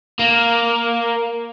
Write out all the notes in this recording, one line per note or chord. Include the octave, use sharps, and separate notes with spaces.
A#3